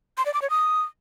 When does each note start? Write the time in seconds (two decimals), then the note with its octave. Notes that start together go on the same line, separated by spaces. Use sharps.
0.18 C6
0.26 D5
0.34 D6
0.42 C#5
0.50 D#6